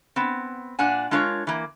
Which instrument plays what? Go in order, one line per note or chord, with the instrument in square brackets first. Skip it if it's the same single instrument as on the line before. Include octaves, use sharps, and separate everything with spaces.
[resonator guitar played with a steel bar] B3 C4
A#2 D4 F#5 G#5
G#3 D4 F4 A#4 C#5
E3 A#3